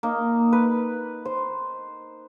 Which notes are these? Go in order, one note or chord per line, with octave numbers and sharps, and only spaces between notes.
A#3 D#4
B4
C5